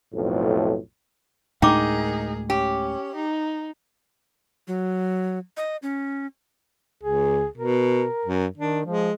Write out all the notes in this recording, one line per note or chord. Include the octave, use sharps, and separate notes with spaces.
B1 F2 A2
D2 A2 G#3 D#4 G#4 A#4 G5 D6
C#4 G4
D#4
F#3
D#5
C#4
C#2 G#4
B2 A#4
F#2
D#3 D4
F3 G#3